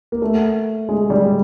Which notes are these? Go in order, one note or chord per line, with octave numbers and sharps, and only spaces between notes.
A#3
A3
G#3
G3